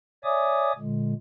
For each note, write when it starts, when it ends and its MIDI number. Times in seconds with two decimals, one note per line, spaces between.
0.24 0.72 73
0.24 0.72 74
0.24 0.72 76
0.24 0.72 80
0.24 0.72 86
0.24 0.72 87
0.78 1.14 46
0.78 1.14 50
0.78 1.14 56